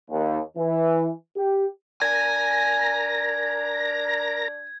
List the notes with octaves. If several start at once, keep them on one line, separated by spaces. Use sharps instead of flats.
D#2
E3
G4
D4 A#4 G#5 A#5 G#6 A#6